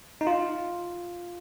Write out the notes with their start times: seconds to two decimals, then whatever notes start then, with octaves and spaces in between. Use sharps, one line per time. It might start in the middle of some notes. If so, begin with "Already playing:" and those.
0.21 D#4
0.27 F4